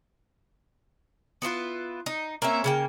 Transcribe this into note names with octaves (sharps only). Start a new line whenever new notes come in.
B3 E4 F4 B4
D#4
A#3 C4 C#4 E5
C#3 A#3 G5